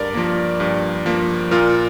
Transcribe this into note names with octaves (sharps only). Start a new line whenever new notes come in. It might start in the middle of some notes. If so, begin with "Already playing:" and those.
Already playing: G2 A#4 D5
F3 A#3
G2
F3 A#3
A#2 F4 A#4